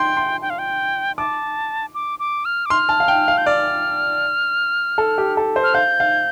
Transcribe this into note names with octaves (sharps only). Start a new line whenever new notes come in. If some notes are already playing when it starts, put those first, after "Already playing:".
Already playing: G5 C6
C6
G5
F5
G5
A5 D6
D6
D6
F6
D6
C6 F6
A5
F5
G5
F5
G6
D5 F6
A4
G4
A4
C5
F6
F5 G6
F5